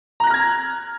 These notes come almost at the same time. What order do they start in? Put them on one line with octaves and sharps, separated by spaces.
A#5 F#6 A#6 F6 G#6